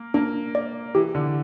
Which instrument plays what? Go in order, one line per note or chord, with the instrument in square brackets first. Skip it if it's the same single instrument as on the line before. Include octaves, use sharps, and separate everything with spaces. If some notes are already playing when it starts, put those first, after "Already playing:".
Already playing: [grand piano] A#3
[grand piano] A#3 [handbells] D4
[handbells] D5
[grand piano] E3 [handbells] G4
[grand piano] D3